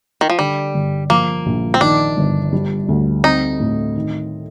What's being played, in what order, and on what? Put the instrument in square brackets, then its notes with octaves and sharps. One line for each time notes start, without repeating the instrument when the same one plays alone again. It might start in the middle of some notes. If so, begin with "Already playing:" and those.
[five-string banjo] D#3
F3
[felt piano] D3 [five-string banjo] G3
[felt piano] G1
[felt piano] F3 [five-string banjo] A#3
[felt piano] A#1
[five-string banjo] C4
[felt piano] D#3 [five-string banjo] D4
[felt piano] G1
G3
D2
[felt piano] C4 [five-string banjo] D#4
[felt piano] A2
D#3